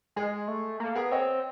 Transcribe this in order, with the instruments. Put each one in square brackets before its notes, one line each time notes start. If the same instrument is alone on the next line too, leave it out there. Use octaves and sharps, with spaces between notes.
[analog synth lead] G#3 [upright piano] G#4
[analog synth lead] A3
[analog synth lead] A#3 [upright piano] A4
[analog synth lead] B3 [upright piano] G#4 A#4
[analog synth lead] C4 [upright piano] C#5 D#5